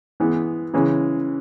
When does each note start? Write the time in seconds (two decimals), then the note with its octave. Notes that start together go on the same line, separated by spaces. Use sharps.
0.20 E3 G#3 B3
0.74 C#3 E3 G#3 C#4